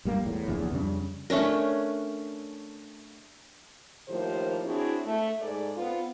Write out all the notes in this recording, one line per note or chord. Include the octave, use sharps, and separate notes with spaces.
A#1 G3 A#3
E2 A2
D1 A#1 E2
F2 C#3 G3 D4
A3 C#4 D4 A#4
A2 D#3 F3 A#3 G4 C5
C4 D4 E4 F#4 G#4 C#5
A3
G#2 G#4 A4 D5
B3 C4 F4